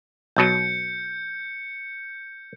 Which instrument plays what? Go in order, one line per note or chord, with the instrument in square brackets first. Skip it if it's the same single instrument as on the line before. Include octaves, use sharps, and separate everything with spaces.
[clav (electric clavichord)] B1 B2 F#3 [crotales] G6 C#7